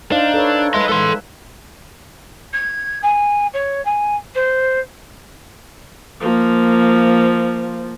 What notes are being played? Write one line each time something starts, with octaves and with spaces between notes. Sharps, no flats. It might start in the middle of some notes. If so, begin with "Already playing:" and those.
D4 D#4 C5 F5
A4 B4 C#5
B4 D#5 E5 C6
G#3 A4 C6
G#6
G#5
C#5
G#5
C5
F3 A#3